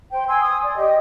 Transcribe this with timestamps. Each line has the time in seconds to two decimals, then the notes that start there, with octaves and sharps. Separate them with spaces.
0.11 C5 G5
0.28 G#5 C6 E6
0.41 D#6
0.63 D5
0.75 G4 D#5